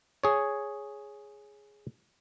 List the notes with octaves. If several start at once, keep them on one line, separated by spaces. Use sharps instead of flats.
G#4 C#5